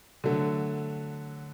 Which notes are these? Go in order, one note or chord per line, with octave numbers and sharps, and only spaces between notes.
D3 F#3 A3